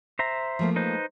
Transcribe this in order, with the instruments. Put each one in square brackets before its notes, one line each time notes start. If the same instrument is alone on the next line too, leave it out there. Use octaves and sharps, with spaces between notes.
[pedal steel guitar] C5 E5 A#5
[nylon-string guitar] F3 A3 A#3
[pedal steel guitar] D#4 B4 C5